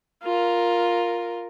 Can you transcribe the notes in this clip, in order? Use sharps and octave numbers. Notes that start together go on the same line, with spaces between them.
F4 A#4